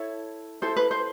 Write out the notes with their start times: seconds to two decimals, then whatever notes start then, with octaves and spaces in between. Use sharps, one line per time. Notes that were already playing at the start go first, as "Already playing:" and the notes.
Already playing: E4 A4 C#5
0.62 E4 A4 C5
0.76 B4
0.91 C5